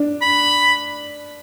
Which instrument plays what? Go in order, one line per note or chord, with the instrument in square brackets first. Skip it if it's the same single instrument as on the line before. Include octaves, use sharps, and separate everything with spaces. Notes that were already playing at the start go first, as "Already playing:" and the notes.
Already playing: [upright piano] D4
[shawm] B5